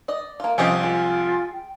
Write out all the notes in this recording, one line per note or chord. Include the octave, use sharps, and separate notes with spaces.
D5 D#5
A#3 F4
C2 F3 C#4 G4 D#5 F5 D#6
G#3 F4 G#5
G5